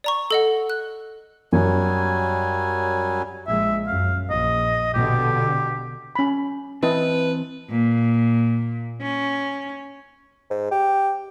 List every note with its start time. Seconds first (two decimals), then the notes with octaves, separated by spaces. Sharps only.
0.04 D5 A#5 C#6
0.31 A4 D#5 F#5
0.70 F#6
1.52 F#2 F#3 G3 G#5
3.47 A#1 G#3 E5
3.87 F#2 F5
4.30 A#1 D#5
4.94 B2 D3 G4
6.15 C#4 B5
6.83 E3 C4 E4 B4 D#5 A5
7.70 A#2
9.02 C#4
10.50 G#2
10.71 G4